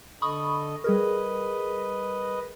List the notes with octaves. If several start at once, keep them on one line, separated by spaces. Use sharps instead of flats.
D3 A4 D#5 B5 C#6 D#6
G3 G#4 A#4 B4 D#5